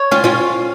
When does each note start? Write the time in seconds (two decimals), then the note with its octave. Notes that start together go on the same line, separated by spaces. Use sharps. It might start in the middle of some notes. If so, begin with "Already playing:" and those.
Already playing: C#5
0.11 C#4 F4
0.24 C#4 F4